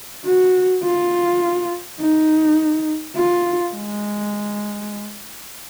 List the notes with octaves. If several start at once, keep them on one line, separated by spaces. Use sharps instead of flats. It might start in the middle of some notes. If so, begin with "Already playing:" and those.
F#4
F4
D#4
F4
G#3